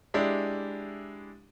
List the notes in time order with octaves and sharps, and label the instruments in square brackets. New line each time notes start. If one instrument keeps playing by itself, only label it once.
[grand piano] G#3 D4 E4 G4